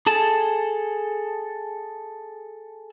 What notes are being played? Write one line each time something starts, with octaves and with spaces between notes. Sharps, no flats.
G#4 A4 A5